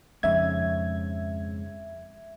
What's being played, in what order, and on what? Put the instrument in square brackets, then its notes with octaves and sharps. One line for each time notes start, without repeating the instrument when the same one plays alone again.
[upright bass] F2 [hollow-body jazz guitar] G#2 C#3 [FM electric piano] E5 G#6